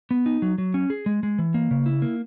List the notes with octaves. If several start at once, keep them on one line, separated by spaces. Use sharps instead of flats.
B3
D#4
F#3
F#3
C#4
G#4
G#3
G#3
E3
A#3
C#3
E4
A#3